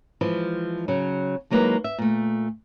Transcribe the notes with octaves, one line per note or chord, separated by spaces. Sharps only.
E3 F3 G#3 E4
C#3 F#3
D#2 F#3 G#3 A#3 E4 B4
E5
A#2 A3